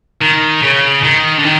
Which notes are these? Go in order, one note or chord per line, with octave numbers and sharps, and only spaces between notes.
D#3
C#3
D#3
D3
D#3